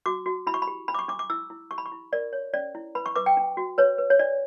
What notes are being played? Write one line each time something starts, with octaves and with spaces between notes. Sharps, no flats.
F#4 D6
F#4
E4 B5
C#6
B5
G4
D4 B5
D6
C#6
D4 D6
D6
E4 E6
E4
G4 C#6
B5
C#6
E4
A#4 D5
C#5
C#4 D5
E4
B4 B5
C#6
B4 D6
G5
D4
F#4
B4 C#5
B4
C#5
D4 D5